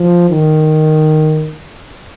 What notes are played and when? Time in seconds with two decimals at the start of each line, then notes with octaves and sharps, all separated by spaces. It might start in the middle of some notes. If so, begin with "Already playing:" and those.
Already playing: F3
0.30 D#3